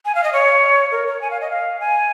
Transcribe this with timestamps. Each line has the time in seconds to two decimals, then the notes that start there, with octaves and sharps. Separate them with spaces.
0.06 G#5
0.15 F5
0.24 D#5
0.33 C#5
0.92 A#4
1.07 C#5
1.21 G#5
1.31 F5
1.41 D#5
1.51 F5
1.80 G#5